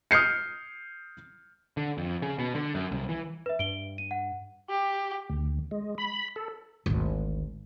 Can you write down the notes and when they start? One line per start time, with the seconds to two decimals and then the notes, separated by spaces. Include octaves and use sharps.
0.11 D#6 F6 G6 C7 C#7
1.77 D3
1.98 F2
2.22 C#3
2.38 B2
2.55 D3
2.75 F#2
2.91 C2
3.09 E3
3.46 B4 E5
3.59 G2 D7 G7
3.98 D#7
4.11 F#5
4.69 G4
5.30 D2
5.71 G#3
5.98 B5
6.36 A4
6.86 G#1 D2